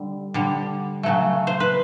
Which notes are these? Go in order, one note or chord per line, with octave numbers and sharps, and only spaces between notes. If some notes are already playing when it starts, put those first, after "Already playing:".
Already playing: D3 G3
D3 G3
C#3 F#3 A3
C5
B4